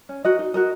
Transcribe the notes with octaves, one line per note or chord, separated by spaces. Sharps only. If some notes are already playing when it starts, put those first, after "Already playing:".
C#4
F#4 A#4 D#5
D#4
F#4 A#4 D#5